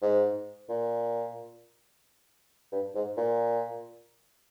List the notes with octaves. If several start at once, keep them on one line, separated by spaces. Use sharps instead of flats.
G#2
A#2
G2
G#2
A#2